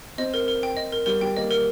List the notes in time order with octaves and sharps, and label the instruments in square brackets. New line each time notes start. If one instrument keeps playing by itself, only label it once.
[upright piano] C4 [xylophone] D#5
[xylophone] A#4
A#4
G5
D#5
A#4
[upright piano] G3 [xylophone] A#4
[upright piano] G3 [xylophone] G5
[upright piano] A#3 [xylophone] D#5
[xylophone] A#4